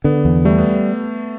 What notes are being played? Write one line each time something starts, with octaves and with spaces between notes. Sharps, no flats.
D3 B3
E2
G3 A3
B3